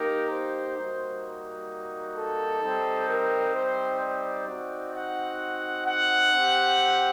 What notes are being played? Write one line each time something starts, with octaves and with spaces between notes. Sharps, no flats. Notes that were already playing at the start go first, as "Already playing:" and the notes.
Already playing: A#3 D#4 G4 A#4
C5
G3 A#3 D#4 F#4
A4
G3 C4 D#4
A#4
C5
D5
C4 D#4 F#4
F#5
F#5
C4 G4